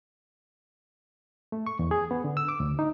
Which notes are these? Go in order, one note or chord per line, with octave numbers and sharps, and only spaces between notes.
A3
C#6
E2
G#4
B3
D3
E6
D6
D2
D#4